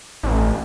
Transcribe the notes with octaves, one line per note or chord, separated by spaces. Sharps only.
A1